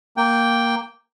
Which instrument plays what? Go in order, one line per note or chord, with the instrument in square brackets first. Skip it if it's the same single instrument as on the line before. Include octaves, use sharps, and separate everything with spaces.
[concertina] A#3 G5